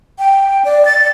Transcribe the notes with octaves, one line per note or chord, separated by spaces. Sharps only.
G5
D5
A6